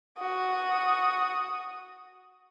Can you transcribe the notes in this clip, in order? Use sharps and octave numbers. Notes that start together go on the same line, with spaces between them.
F#4 D#6